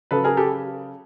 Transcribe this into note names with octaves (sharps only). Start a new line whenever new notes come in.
C#3 F#3 A4 B4
G#4 A#4
G4 A4